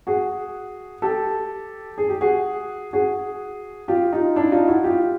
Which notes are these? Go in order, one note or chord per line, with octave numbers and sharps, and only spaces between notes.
F#4 G#4
G4 A4
G#4
G4
F#4 G#4
F#4 G#4
F4 G4
D#4 F4
D4 E4
D#4 F4
E4 F#4
F4 G4